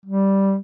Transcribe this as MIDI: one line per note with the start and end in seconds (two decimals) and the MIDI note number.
0.06 0.56 55